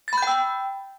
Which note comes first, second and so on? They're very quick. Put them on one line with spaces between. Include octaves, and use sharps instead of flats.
A6 B5 G6 G5 E6